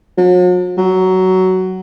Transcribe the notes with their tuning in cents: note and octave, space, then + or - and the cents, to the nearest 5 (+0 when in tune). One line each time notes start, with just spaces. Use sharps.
F#3 -45
F#3 +15